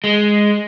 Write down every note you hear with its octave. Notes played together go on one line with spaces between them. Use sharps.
G#3